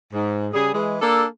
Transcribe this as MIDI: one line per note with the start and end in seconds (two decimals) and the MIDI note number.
0.13 0.48 44
0.54 0.74 49
0.54 0.74 55
0.54 0.74 68
0.74 0.96 52
0.74 0.96 56
1.02 1.26 58
1.02 1.26 62
1.02 1.26 69